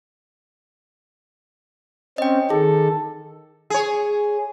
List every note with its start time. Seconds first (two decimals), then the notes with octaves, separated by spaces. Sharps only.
2.18 C4 C#4 D#5 G5
2.50 D#3 G#4 A4
3.70 G#4 C#5